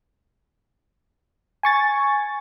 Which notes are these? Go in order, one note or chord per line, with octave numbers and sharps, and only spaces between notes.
G#5 C#6 A6